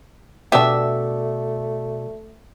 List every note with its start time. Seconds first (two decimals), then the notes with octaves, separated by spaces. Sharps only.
0.52 B2 A3 B3 D4 F#4 G4 D5 E5